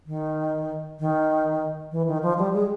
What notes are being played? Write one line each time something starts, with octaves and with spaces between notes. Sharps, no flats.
D#3
D#3
E3
D#3
F3
G3
G#3